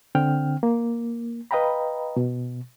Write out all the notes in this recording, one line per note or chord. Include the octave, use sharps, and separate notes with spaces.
D3 C4 G5 F6
A#3
B4 D#5 F5 G5 A#5 B5
B2